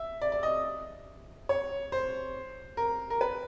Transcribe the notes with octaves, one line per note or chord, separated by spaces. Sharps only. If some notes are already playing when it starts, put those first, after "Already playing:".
Already playing: E5
D5
D5
D#5
C#5
C5
A#4
A#4
B4